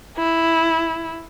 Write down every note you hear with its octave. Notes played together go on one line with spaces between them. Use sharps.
E4